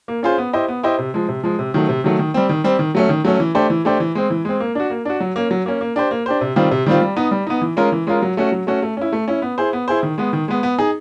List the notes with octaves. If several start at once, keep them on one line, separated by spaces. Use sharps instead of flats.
A#3
C#4 F4 G#4 C5
B3
E4 G4 C5 D#5
B3
E4 G4 C5 D#5
C3
F3 G#3
C3
F3 G#3
C3
D#3 F#3 A3
C3
D#3 F#3 A3
D#3
G3 C4
D#3
G3 C4
D#3
F#3 A3 C#4
D#3
F#3 A3 C#4
E3
A3 D4 G4 C5
E3
A3 D4 G4 C5
E3
G#3 C4
E3
G#3 C4
A#3
D4 F#4
A#3
D4 F#4
F#3
A#3 C#4
F#3
A#3 C#4
A#3
D4 G4 C5
A#3
D4 G4 C5
C3
D#3 G3 C4 F4
C3
D#3 G3 C4 F4
G3
B3 D#4
G3
B3 D#4
E3
G#3 C#4 F4 A#4
E3
G#3 C#4 F4 A#4
F#3
A3 C#4 F#4
F#3
A3 C#4 F#4
A3
C#4 E4
A3
C#4 E4
B3
E4 G#4 C5
B3
E4 G#4 C5
D#3
G#3 B3
D#3
G#3 B3
B3
D#4 G#4